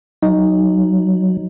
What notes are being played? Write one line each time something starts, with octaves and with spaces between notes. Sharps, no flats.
F#3 D#4